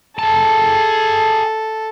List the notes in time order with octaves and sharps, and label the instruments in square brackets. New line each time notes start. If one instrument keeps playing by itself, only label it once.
[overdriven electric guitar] G#4 A5 [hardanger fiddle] A4